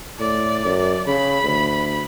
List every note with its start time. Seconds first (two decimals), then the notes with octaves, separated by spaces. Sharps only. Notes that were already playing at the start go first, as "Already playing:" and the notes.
0.19 A2 D5
0.65 F#2
1.07 C#3 B5
1.44 D2